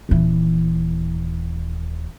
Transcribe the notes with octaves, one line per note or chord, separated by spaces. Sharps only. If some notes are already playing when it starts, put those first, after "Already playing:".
D#1 E3